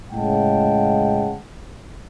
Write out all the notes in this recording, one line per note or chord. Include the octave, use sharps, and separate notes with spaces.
A2 C#3 G#3 F#5 G5 A5